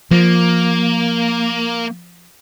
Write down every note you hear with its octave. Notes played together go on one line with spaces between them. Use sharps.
F3 A#3